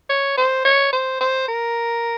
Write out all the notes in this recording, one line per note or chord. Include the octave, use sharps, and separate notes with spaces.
C#5
C5
C#5
C5
C5
A#4